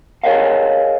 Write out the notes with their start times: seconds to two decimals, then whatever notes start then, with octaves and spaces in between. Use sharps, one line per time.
0.24 G#4 A#4 B4 C#5 D#5 F5